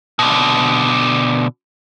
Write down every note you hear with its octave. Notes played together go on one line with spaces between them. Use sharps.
B2 D3